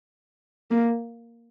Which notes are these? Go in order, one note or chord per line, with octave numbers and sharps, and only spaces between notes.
A#3